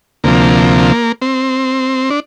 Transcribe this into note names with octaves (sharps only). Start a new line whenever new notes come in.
D2 C3 F3 A#3
C4
D4